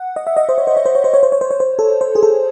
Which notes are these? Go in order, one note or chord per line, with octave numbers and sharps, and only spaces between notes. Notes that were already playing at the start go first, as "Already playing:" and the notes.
Already playing: F#5
D#5
E5
D#5
C5
C#5
C5
C#5
C5
C#5
C5
C#5
C5
C#5
C5
C#5
C5
A4
C5
G#4
A4